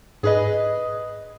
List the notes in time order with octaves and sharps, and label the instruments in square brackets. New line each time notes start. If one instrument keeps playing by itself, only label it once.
[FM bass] G#2 [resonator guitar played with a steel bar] G#4 B4 D#5